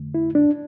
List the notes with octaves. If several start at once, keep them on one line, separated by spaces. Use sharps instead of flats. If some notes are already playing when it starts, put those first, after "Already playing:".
Already playing: F2 D3 A3
E4
D4